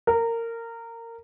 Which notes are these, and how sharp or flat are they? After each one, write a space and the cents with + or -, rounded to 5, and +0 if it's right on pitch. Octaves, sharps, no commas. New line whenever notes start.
A#4 -20